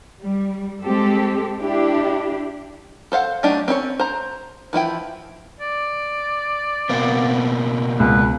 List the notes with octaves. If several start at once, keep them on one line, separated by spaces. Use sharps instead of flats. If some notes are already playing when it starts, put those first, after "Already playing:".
G3
G#3 C4 G4 A4
D4 E4 G4
A4 C5 F5 F#5
F#3 A3 D4 D#4 G4
C4 C#4 D#4 C#5
C5 A#5
E3 F3 E4 G5
D5
B2 A#3 C4
C#2 B4